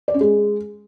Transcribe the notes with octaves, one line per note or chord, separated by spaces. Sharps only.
D5
C#4
G#3